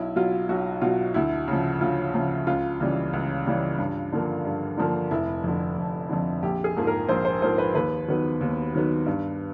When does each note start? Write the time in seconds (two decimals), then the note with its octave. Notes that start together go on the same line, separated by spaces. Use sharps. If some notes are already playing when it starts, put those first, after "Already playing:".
Already playing: B1 E4
0.16 B2 F#3 F4
0.49 B1 F#4
0.81 B2 F#3 F4
1.14 D2 E4
1.48 C#3 F3
1.81 D2 F4
2.14 C#3 F3
2.47 C#2 F4
2.80 C#3 E3 G3
3.13 C#2
3.46 C#3 E3 G3
3.78 G2
4.12 D3 F3 A#3
4.45 G2
4.78 D3 F3 A#3
5.11 F1 E4
5.44 F2 D3
5.77 F1
6.10 F2 D3
6.43 A#1 G4
6.64 G#4
6.76 G#2 F3 A#3
6.87 A#4
7.09 A#1 C5
7.25 C5
7.42 G#2 F3 A#3 C5
7.58 B4
7.75 D#2 B4
8.08 D#3 F#3 B3
8.41 D#2
8.74 D#3 F#3 B3
9.06 G2